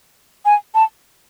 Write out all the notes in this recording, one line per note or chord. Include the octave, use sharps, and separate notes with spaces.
G#5
A5